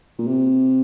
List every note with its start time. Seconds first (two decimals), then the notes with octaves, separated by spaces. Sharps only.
0.18 A#2
0.27 C3